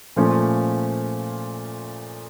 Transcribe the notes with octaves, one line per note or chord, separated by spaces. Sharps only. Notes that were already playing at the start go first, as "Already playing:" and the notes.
A#2 F3 A3 C#4